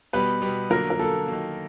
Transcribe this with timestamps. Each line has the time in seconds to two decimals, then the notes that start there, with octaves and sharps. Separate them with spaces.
0.13 B2 G3 B3 B4
0.42 B2 G3 B3
0.70 D3 F#3 A#3 A#4
0.90 A#4
0.99 D3 F#3 A#3 A4
1.28 D#3 F#3 A#3